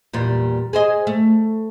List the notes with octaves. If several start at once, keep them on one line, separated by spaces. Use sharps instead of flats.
E2 A#2 G3
G#4 C5 D#5
A3